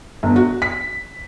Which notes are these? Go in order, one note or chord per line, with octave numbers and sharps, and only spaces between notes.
G1
F#4
B6